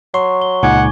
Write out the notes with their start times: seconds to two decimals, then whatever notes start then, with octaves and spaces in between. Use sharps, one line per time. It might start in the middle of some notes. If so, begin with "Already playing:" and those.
0.14 F#3 C6 C#6
0.42 G7
0.63 C#2 A#2 D#4 F#5 G#5 D6 G#6